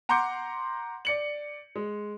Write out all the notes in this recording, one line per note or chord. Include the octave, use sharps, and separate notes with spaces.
F#5 A#5 C6 D6 G6 C#7
D5 C#7 F#7
G#3